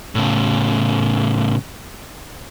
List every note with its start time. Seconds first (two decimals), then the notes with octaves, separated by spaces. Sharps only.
0.15 A2 C#3